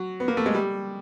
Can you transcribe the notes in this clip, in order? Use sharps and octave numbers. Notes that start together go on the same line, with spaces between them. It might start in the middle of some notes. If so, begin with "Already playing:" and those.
Already playing: F#3
B3
A#3
A3
G#3
G3